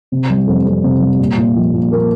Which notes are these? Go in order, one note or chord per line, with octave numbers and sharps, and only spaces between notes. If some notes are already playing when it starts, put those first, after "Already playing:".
C3
G3
F2
F2
C3
G3
A#2
A#2
F3
A#2
A#3